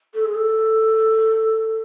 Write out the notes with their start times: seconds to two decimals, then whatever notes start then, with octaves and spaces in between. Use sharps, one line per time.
0.14 A4
0.25 G#4
0.35 A4